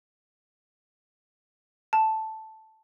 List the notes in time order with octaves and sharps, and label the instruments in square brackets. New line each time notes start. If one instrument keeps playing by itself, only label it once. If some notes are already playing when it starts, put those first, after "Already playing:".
[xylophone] A5